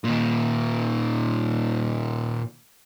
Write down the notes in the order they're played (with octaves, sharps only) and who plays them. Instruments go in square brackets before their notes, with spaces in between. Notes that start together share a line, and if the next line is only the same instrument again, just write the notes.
[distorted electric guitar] A#2 D#3